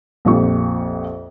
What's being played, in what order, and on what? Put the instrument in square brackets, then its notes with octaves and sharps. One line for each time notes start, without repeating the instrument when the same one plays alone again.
[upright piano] A#1 F2 F3 G4 C#6